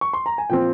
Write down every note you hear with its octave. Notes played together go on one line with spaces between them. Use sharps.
C#6
C6
A#5
G#5
A#2 F3 C4 G5